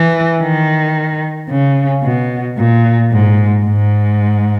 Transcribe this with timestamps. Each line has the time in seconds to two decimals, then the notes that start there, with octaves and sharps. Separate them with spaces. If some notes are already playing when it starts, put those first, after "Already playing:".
Already playing: E3
0.42 D#3
1.49 C#3
2.03 B2
2.58 A#2
3.12 G#2
3.66 G#2